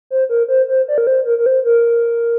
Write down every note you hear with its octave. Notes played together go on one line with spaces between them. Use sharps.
C5
A#4
C5
C5
D5
A#4
C5
A#4
A#4
C5
A#4